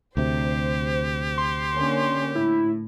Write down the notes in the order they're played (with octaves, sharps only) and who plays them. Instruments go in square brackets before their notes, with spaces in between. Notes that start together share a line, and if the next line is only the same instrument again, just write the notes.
[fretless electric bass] D2 C3 [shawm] G4 [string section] C5
[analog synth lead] C6
[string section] D3 A#3 C#4
[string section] A2 [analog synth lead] E4